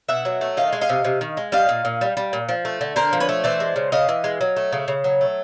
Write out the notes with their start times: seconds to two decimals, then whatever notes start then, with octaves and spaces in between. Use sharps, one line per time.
0.08 B2 E5 F#5
0.25 F#3
0.41 A3
0.57 D#3 D#5 F5
0.73 G#3
0.81 D#5 F5
0.89 C3
1.04 C3
1.21 D#3
1.37 G#3
1.52 G3 D#5 F5
1.69 A#2
1.85 A#2
2.01 G3
2.17 G3
2.33 A#2
2.49 F3
2.65 A3
2.81 D3
2.96 D3 A#4 C5
3.13 F3
3.20 B4 C#5
3.29 A3
3.44 E3 C5 D5
3.60 G#3
3.76 C#3
3.92 C#3 D#5 F5
4.09 E3
4.24 G#3
4.41 F#3
4.56 A3
4.73 C#3
4.88 C#3
5.04 F#3
5.21 A3